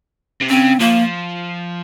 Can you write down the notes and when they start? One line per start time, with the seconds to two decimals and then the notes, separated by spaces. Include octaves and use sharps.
0.41 C3
0.49 C#3 C4
0.80 F3 A#3